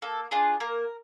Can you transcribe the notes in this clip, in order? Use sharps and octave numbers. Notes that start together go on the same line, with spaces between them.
A#3 A4
D4 F4 G#4
A#3 A#4